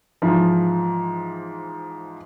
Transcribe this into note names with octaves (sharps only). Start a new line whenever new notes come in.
G#2 E3 F3